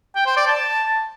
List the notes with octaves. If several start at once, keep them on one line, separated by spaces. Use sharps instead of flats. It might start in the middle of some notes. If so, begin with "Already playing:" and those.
G5
C5
D5
A5